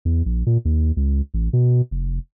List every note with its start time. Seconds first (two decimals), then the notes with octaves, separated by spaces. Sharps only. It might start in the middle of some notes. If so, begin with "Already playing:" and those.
0.05 E2
0.26 A#1
0.46 A#2
0.65 D#2
0.97 C#2
1.34 A1
1.53 B2
1.91 F1